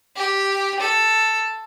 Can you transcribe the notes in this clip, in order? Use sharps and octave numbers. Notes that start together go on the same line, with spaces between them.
G4
A4